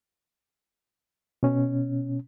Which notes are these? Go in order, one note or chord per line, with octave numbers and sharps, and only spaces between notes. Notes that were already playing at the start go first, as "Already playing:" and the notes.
B2 C#4